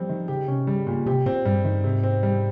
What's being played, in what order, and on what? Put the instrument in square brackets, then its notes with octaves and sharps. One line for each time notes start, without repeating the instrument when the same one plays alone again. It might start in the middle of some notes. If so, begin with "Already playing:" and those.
Already playing: [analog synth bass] F3 [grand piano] G3 C4
[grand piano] D#3
[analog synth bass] C#3 [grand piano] G4
[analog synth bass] C3 [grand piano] C#4
[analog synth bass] C#3 [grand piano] G3
[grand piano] A#2
[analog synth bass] C3 [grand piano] G4
[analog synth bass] A#2 [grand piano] C4
[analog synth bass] G2 [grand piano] G3
[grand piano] D#3
[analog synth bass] G#2 [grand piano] C3
[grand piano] C4
G3